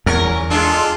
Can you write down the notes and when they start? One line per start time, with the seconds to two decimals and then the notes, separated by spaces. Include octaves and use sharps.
0.06 E2 C#4 A#4
0.50 G#3 D4 F4 A4